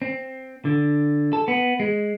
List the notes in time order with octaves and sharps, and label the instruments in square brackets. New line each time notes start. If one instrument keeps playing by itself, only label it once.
[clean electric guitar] C4
D3
A4
B3
G#3